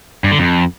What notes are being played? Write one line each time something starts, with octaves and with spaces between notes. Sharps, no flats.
G2
D3
F2